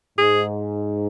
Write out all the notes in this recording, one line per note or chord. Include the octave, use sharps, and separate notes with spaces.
G#2 G#4